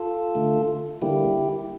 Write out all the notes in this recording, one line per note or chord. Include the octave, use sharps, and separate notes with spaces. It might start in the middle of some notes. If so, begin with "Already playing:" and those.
Already playing: F4 A4
D3 A3
D3 G3 A#3 E4 G4